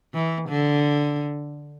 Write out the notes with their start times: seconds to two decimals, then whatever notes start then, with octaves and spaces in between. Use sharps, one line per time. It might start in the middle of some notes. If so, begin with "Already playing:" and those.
0.14 E3
0.49 D3